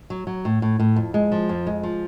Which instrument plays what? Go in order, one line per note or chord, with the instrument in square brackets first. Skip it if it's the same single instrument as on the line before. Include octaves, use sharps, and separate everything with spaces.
[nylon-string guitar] F#3
F#3
A2
A2
A2
F2
G#3
F3
F2
G#3
F3